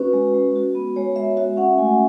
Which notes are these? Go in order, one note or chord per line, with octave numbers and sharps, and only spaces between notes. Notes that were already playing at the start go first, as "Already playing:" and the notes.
Already playing: C#4 F#4 B4
G#3
G#3
F#4
B3
G#3 C#5
G#3 E5
F#4 E5
C#4 F#5
A3 G#5